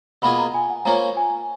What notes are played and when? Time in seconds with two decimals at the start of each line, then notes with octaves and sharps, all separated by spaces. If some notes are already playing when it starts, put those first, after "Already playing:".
0.22 B2 A#3 F4 G#4 B5
0.38 A#5
0.54 G#5
0.70 F#5
0.85 F3 A#3 C#4 A#5
1.01 A#5
1.17 G#5